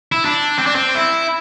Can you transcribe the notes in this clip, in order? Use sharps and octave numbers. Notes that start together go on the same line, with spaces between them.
E4
D4
C4
D4
C4
E4